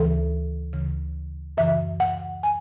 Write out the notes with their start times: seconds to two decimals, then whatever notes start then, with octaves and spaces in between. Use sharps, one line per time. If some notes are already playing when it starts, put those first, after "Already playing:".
Already playing: D2 C#3 E3 A4
0.73 D2 C#3 E3
1.57 F#2 C#3 E3 E5
2.00 F#5
2.43 G#5